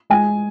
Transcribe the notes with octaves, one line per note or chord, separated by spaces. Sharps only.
G#3 G#5